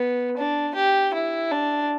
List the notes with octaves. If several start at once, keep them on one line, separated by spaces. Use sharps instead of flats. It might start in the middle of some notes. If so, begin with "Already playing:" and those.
Already playing: B3
D4
G4
E4
D4